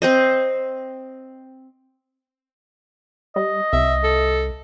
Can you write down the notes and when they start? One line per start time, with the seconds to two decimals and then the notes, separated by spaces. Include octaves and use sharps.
0.02 C4 C5 D#5
3.36 G3 D#5
3.73 C2 E5
4.03 A4